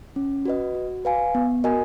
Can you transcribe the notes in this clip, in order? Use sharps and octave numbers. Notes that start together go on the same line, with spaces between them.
C#4
F#4 B4 D#5
F#4
B4 F5 G#5
B3
F#4 A#4 D#5 G#5